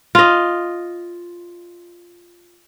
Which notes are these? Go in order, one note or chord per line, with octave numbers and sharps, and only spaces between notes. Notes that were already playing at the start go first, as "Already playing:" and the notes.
F4 D#5